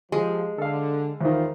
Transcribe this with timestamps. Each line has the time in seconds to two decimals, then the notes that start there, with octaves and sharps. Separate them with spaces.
0.12 F3 G#3 G4
0.58 D3 A4 F5
1.21 E2 D#3 F4 C5